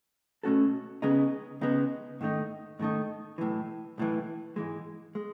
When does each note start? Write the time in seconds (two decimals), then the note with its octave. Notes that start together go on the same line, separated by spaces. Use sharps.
0.43 B2 A3 C#4 F#4 A4
1.02 C#2 C#3 G#3 B3 D#4
1.61 C#2 C#3 G#3 B3 D#4
2.21 G#2 D#3 A3 D#4
2.79 G#2 D#3 A3 D#4
3.38 B1 A2 E3
3.98 B1 A2 E3
4.56 G#2 E3 G#3
5.15 G#3